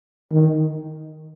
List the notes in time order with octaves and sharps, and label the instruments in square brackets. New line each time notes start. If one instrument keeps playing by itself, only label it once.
[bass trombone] D#3